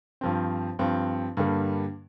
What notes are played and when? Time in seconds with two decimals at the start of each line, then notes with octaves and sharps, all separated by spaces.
0.21 G2 F3 C4
0.79 G2 F3 C4
1.37 G2 D3 G3 A#3